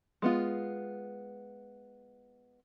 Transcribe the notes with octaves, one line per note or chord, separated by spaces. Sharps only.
G#3 B3 F4